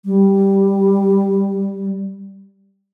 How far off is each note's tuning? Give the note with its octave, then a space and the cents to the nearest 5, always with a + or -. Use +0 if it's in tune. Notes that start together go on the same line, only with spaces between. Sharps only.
G3 +0